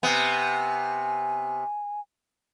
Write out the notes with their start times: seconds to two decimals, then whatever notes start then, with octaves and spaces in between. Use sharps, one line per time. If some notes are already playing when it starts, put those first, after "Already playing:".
0.03 C3 B3 G#5